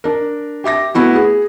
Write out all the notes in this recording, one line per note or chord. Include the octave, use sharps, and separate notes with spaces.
D4 A#4
G4 E5 D6 A#6
A3 B3 E4 F#4
G#4